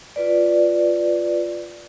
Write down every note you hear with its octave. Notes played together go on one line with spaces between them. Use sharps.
F4 B4 D5